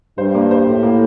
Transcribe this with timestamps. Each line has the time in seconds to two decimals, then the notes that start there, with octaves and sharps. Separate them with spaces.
0.18 G2 C5
0.35 A#3
0.51 C5
0.67 A2 G4
0.83 A#3